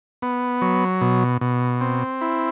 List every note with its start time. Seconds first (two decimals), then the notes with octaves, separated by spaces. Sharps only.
0.22 B3
0.62 F#3
1.01 B2
1.41 B2
1.81 C4
2.21 E4